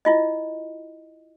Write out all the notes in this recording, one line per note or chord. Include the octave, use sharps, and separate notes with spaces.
E4 F4 D#5